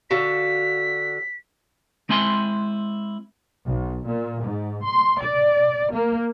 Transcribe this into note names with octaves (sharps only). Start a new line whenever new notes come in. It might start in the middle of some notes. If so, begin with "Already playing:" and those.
D3 F#4 F5 B6
G#3 C4 E4 G#5 C6
B1
A#2
G#2
C6
D5
A#3